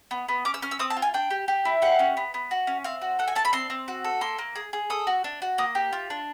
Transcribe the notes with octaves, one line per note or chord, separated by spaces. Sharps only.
B3
B3
C#4 D6
E6
C#4 F6
E6
C4 D#6
A5
F4
G#5
D4 G5
G4
G4
E4
G4 F#5
C#4
B3
B3
F#4
C#4
C4 F5
F#4
A4 F#5
G#5
D4 A5
B5
C4 C6
C4
F#4
A4
A#3 C6
A#3
G#4
G#4
A4 D#6
F#4
D4
F#4
A#3 D#6
G4
F4
D4